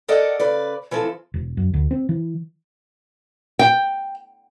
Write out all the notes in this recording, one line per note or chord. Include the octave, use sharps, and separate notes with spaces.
A4 A#4 D5 D#5 F#5
C#3 B4 D5
E3 F3 C4 A4
E1
F#2
D2
C4
E3
G5